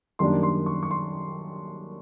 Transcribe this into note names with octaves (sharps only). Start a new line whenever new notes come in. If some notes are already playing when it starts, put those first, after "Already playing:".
F#2 D#3 G3 A#3 D4 C6
C6
C#6
C#6
C6